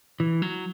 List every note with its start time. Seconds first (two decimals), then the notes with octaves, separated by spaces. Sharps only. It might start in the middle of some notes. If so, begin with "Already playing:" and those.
0.20 E3
0.42 F#3